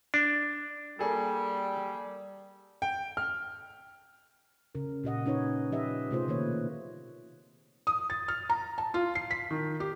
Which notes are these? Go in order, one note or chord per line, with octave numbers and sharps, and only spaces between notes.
D4
G3 A#3 G#4 A4
G5
F6
C#3 C#4 A#4
A#2 G4 D#5 F#5
C#4 D#4 B4 C#5
F3 G4 B4 D#5 E5
C3 A3 F4 G#4 C5
B2 D#3 A#3 B4 C#5
D#6
A6
F6
A#5
A5
F4
C7
B6
D#3
G4